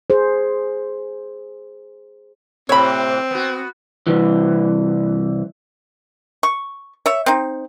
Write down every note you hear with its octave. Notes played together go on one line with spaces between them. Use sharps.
G#4 C5
A2 C3 C4 C#5 B5
B3 F#4
C2 E3
C#6
C#5 E5
C4 D#4